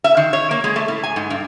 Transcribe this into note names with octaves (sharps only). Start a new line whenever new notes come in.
E5
D#3
C#5
A#3
G#3
A3
A2
G#5
G#2
G2